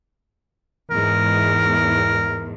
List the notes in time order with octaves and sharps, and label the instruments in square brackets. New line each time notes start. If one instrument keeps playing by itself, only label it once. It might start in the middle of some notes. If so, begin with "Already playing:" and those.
[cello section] E2 G#2 [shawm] A#4